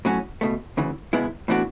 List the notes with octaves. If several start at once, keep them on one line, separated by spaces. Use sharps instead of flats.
A2 F#3 C#4 F#4
C#2 B2 A3
D2 C#3 E3
C#2 B2 G#3 B3 E4
A2 E3 B3 D4 F#4